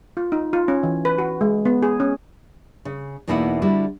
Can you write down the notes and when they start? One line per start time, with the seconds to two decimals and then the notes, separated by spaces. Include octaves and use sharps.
0.17 F4
0.32 D#4
0.53 F4
0.68 C#4
0.83 E3
1.05 B4
1.18 F#4
1.41 G#3
1.65 B3
1.83 G#4
2.00 C#4
2.85 C#3
3.28 E2 B2 A#3 D#4 E4 F#5
3.62 D3 G3 E4 F#4